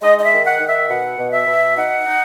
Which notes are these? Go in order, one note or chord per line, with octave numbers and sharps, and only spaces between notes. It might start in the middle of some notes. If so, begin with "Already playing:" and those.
G#3 D#5
D#5
E5
D#3
F#5
D#3
E5
B2 F#5
B2
E5
B2
D#4 F#5
D#4